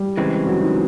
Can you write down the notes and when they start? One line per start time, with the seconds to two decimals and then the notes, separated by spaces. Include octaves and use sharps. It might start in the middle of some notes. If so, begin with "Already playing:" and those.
Already playing: G3
0.17 C#3 E3 G#3 C4
0.46 F#3
0.61 D#3